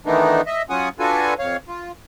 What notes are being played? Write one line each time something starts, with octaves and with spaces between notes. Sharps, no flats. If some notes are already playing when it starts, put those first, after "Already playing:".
D#3 E3 A3 B3 D4 D#4
D#5 E5
F#3 C#4 F4 F#5 G#5 D#6
D4 F4 F#4 A4 B4 G#5
F2 C#5 F5
F4